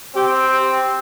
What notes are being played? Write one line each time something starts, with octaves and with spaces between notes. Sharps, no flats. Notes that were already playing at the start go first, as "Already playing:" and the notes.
C4 G4